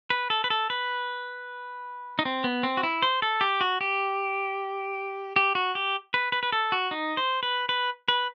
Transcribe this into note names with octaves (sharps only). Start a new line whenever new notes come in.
B4
A4
B4
A4
B4
D#4
C4
B3
C4
F#4
E4
C5
A4
G4
F#4
G4
G4
F#4
G4
B4
B4
B4
A4
F#4
D#4
C5
B4
B4
B4